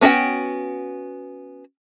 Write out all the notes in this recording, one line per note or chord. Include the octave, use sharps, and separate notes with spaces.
B3 C#4 F#4 A#4 G5